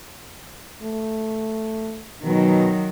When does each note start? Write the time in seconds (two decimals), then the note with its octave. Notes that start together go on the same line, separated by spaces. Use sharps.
0.82 A3
2.24 B2 D#3 F#3